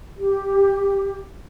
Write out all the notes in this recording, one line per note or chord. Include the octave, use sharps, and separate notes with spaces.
G4